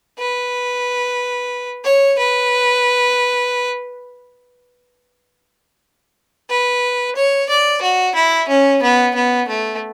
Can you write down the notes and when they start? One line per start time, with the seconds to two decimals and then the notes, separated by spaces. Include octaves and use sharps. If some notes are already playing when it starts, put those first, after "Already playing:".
0.19 B4
1.84 C#5
2.18 B4
6.50 B4
7.16 C#5
7.49 D5
7.82 F#4
8.15 E4
8.48 C#4
8.82 B3
9.15 B3
9.48 A3